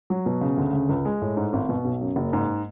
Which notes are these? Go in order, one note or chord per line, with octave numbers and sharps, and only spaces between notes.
F#3
B2
C#3
D2
C#3
C#2
G#3
A2
G#2
G#1
B2
B1
F#2
F#1
G#2